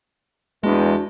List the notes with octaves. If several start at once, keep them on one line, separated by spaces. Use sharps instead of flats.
E2 G#3 D4 F#4 A5